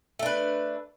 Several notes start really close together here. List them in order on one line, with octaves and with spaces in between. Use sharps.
A3 D4 B4